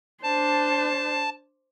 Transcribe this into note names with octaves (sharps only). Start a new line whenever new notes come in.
D4 C5 A5